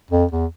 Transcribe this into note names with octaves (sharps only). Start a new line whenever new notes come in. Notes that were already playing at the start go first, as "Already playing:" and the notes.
F2
E2